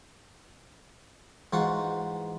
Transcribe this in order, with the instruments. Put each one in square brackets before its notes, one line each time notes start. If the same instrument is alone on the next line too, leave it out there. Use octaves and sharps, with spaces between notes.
[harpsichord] G#2 F4 F#4 [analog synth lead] E3